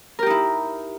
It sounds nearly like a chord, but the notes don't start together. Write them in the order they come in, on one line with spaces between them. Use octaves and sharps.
A#4 G4 D#4 E4